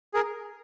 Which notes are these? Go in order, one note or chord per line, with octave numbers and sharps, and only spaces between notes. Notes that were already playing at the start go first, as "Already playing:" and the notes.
G#4 A#4